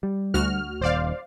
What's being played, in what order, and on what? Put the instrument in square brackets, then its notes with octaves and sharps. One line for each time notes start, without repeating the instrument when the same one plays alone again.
[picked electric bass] G3
[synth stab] D2 F#4 F6
[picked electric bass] D#1 D#2 [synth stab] C5 D5 F5